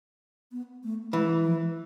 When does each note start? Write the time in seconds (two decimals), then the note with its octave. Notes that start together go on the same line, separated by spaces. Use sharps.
0.52 B3
0.84 A3
1.13 E3 G#3
1.44 F3